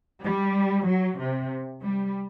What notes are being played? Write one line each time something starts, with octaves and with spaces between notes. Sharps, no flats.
G3
F#3
C3
G3